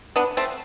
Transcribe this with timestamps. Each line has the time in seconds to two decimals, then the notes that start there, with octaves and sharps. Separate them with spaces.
0.16 B3 D4
0.37 A3 C4